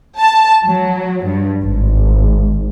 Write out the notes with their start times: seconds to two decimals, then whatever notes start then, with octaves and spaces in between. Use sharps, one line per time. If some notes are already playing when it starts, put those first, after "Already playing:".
0.18 A5
0.65 F#3
1.25 G2
1.61 G#1